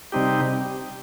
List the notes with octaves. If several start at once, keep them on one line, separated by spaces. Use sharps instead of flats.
C3 G3 C4 D#4 G4